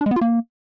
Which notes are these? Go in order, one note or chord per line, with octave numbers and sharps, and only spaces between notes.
D4
G#3
B3
F4
A#3